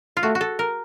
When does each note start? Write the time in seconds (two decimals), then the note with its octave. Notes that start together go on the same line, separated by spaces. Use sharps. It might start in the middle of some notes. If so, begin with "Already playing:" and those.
0.17 F4
0.23 A3 F#4
0.35 F#4
0.41 A4
0.59 A#4